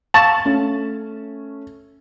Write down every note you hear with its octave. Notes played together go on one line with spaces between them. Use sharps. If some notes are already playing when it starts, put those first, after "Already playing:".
F5 A5 C#6
A3 C#4